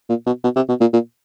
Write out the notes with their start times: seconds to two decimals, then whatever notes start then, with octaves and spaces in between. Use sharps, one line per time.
0.09 A#2
0.26 B2
0.44 B2
0.56 C3
0.69 B2
0.81 A#2
0.93 A#2